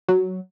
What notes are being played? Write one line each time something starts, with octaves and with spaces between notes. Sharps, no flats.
F#3